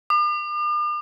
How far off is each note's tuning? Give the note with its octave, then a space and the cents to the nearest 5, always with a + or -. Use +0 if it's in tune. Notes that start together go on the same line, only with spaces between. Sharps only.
D6 +45